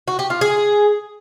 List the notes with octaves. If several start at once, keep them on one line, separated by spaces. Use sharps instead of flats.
F#4
G4
F4
G#4